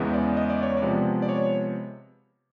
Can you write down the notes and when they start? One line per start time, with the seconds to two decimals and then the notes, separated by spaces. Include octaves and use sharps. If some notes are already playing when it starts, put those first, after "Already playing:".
Already playing: E2 C#3 E3 G#3 B3
0.13 D5
0.37 D#5
0.50 D5
0.63 C#5
0.77 D5
0.82 C3 F3 G#3 B3
1.22 D5
1.29 C#5